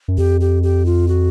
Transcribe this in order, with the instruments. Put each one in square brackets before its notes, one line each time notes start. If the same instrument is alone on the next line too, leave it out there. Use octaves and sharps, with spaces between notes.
[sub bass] F#2
[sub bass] F2 [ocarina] G4
[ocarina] G4
G4
F4
F#4